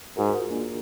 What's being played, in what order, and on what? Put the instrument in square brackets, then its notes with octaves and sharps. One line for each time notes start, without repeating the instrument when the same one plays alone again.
[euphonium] G#2 [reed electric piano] F#4 A#4
[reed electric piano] F#4 A#4
F4 G#4
A#3 D4